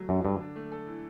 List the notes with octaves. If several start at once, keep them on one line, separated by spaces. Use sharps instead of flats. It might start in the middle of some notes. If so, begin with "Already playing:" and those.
Already playing: F#3 A3
F#2 D3
G2 D3
D4
A3
A4
E3